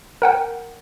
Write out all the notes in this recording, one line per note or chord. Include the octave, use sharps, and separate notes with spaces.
A#4 F#5 G5